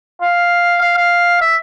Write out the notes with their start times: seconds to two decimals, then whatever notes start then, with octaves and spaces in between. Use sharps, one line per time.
0.21 F5
0.81 F5
0.97 F5
1.41 E5